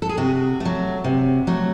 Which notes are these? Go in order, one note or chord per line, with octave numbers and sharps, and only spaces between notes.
A4
G#4
C3 F#4
A3
F#3
C3
F#3 A3